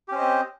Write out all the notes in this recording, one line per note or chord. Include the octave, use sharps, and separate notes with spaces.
C4 C#4 G4 C5 D#5